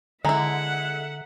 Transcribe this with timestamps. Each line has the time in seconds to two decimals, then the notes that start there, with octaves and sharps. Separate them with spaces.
0.25 D3 G#3 E4 E5 F#5 A#5